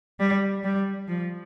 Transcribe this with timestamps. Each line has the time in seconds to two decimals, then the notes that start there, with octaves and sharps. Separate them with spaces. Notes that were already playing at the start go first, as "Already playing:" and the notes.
0.19 G3
0.64 G3
1.08 F3